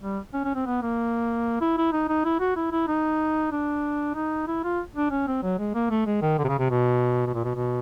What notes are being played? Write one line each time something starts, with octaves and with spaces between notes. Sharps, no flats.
G3
C#4
C#4
C4
B3
A#3
E4
E4
D#4
D#4
E4
F#4
E4
E4
D#4
D4
D#4
E4
F4
D4
C#4
C4
F#3
G#3
A#3
A3
G#3
D#3
D3
C3
C#3
C3
B2
B2
A#2
B2
B2